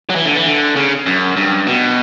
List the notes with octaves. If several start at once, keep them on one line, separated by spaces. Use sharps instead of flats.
F#3
E3
D3
E3
D3
C#3
F#2
G2
B2